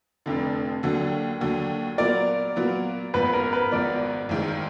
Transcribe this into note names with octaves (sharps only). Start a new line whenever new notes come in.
F1 F2 D3
D#2 D3 F#3
D#2 D3 F#3
A#2 F#3 B3 F4 A#4 D5
A#2 F#3 B3 F4 A#4
G#1 G#2 F3 B3 B4
B4
A#4
B4
G#1 G#2 F3 B3 D5
G#1 G#2 D#3 G#3